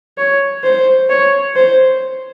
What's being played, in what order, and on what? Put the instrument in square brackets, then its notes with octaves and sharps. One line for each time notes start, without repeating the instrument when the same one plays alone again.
[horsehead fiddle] C#5
C5
C#5
C5